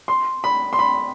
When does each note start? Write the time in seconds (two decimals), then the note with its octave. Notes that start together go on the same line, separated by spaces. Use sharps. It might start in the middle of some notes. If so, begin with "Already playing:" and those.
0.08 C6
0.44 B5
0.73 C6
0.79 B5